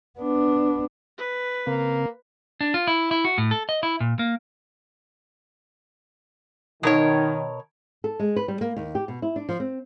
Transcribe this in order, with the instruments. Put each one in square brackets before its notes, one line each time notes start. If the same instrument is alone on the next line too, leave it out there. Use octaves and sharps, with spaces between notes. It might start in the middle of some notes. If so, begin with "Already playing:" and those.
[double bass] B3 D4
[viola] B4
[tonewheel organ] C#3 C4 [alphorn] A#3
[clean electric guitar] D4
F4
E4
E4
F#4
A2
A4
D#5
E4
A#2
A#3
[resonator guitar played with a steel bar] B2 A#4 C#5 [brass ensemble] D#3
[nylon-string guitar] A4
G#3
B4
G3
A#3
D#2
G4
B2
E4
D4
F3
C4